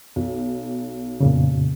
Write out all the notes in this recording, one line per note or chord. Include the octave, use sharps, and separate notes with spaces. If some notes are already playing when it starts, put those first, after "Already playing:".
B1
F2 A#2 C#3